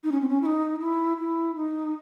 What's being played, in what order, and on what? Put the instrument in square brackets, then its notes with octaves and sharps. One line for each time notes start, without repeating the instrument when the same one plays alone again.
[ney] D#4
C#4
C4
C#4
E4
D#4
E4
E4
D#4